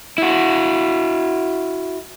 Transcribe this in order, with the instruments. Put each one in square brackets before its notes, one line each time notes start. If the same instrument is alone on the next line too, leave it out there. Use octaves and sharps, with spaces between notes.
[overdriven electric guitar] E4 F#4